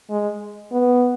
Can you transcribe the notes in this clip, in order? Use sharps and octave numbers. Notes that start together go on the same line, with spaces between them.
G#3
B3